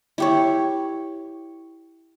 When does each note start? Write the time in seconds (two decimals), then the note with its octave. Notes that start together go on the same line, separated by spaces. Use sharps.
0.18 E4 G4 C#5